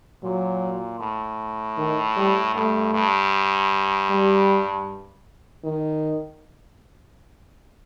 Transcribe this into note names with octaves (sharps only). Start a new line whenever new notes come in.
A#2 F#3
A2
D#3
G3
G2 A3
G2
G3
D#3